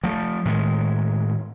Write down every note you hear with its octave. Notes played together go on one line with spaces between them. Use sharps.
F3 A3
A2 D#3 G#3